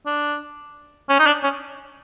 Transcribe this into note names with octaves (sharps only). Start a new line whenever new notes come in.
D4
C#4
D#4
D4
C#4